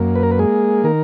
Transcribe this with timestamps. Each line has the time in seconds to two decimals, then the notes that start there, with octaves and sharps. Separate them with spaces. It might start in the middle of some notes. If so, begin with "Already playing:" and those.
Already playing: F#2 A#3
0.15 B4
0.23 A#4
0.31 B4
0.39 G#3 G#4
0.84 D#3 A#4